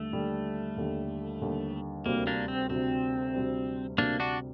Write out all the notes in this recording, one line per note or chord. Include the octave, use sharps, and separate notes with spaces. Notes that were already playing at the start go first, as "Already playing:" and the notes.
Already playing: D#2 D3 G3 A3
D#2 D3 G3
D#2 D3 G3
D#2 D3 G3
D2 C3 G3 A#3
A#3 D4
C4
D2 C3 G3 C4
D2 C3 G3
D2 C3 G3 A#3 D4
D4 F#4